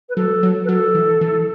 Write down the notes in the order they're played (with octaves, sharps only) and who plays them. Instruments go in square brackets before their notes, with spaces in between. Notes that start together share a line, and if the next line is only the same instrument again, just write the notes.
[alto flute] B4
[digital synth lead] F#3 [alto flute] A4
[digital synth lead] F#3
[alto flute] B4
[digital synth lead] F#3 [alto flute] A4
[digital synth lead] E3
E3